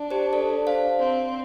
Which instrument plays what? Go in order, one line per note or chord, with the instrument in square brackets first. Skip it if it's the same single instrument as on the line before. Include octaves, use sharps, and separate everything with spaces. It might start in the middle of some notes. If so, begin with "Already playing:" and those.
Already playing: [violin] D4
[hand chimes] G4 C5
A4 D5
C5 F5
[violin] C4